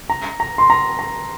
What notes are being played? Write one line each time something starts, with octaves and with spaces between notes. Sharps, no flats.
A#5
A#5
C6
A#5
A#5